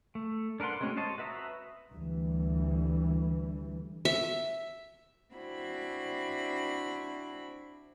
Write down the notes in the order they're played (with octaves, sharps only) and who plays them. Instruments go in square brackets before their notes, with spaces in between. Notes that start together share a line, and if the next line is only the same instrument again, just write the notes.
[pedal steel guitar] A3
D4 A#4 B4 F#5 C6
G#3 A3 C4 C#4 F#4
C5 C#5 D#5 A5
F#4 B4 E5 A#5 D#6
[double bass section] D2 E3 G3
[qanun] E5
[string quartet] C4 D4 E4 F#4 B5